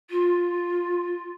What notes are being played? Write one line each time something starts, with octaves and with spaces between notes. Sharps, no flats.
F4